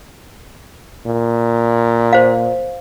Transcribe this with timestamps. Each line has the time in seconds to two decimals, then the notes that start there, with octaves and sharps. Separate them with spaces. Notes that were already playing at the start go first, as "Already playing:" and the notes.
1.06 A#2
2.13 C5 F5